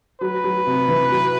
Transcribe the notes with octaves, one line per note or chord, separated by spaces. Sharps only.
F#3 B4
F#3
C3
E3
F#3